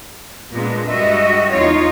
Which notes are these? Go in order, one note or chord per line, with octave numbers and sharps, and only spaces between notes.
A#2 G#3 B3 D4
G2 G3 G#3 F#4 D#5 E5
E2 D#4 F4 C#5